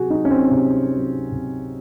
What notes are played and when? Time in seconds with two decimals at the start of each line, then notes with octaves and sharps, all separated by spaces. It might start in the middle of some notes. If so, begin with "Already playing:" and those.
Already playing: C3 F#3 F#4 G#4
0.10 F#3 D#4
0.25 C#4
0.31 C4
0.51 C3
0.92 F#3
1.32 C3